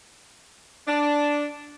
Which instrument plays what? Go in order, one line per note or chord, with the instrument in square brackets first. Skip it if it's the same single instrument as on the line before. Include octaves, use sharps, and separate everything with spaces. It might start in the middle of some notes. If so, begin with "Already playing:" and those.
[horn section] D4